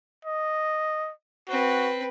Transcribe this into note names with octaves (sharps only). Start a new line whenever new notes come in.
D#5
C4 F#4 B4